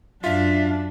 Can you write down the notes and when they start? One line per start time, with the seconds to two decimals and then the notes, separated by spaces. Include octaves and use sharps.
0.24 F#2 D4 F4 E5 F5